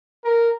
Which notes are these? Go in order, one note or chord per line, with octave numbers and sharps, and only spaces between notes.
A#4